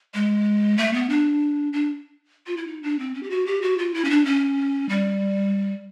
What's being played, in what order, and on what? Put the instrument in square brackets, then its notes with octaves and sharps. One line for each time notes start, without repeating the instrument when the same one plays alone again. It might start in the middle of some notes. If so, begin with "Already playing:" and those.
[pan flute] G#3
A3
B3
D4
D4
F4
E4
D#4
D4
C4
C#4
G4
F#4
G4
F#4
F4
E4
C#4
D4
C#4
G3